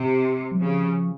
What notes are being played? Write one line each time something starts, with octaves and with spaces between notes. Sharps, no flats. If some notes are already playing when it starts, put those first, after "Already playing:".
Already playing: C3
F#3
C#3 F3